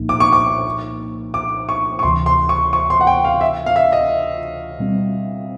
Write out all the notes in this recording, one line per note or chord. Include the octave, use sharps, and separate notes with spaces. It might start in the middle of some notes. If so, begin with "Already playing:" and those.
Already playing: C2 A#2 F3 A#3 D#4
D6
C#6
D6
D6
C#6
C#6
D2 C3 E3 C6
C6
C#6
C#6
C6
F#5
G5
F5
E5
F5
E5
D#5
B2 G3 C4